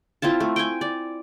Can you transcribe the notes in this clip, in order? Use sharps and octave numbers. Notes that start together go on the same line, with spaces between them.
C4 E4 F4 A5
A3
G5 G#5
D5